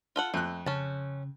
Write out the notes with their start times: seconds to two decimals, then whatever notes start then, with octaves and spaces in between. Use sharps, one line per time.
0.16 F4 A4 F#5
0.34 F2 A3 F#6
0.66 C#3 C#4 A5